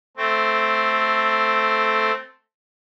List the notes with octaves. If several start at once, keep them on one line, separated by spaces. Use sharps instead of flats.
A3 C4